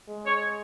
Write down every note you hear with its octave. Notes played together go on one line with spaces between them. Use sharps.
G#3
C#5